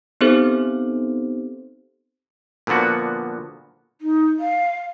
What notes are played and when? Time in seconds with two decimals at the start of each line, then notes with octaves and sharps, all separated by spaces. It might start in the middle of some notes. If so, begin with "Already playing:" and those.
0.21 B3 C4 D#4 G4 A4 C5
2.67 A#2 D3 F3 B3 F#4
4.01 D#4
4.39 F5